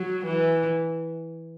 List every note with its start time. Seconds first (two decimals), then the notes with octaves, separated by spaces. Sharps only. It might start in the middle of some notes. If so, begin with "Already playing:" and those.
Already playing: F#3
0.25 E3